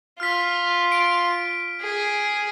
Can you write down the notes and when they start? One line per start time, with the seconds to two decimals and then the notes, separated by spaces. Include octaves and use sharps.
0.20 F4 F6 B6
0.92 D7
1.81 G#4